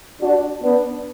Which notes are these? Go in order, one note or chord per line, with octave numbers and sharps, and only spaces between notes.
D4 F#4
B3 D4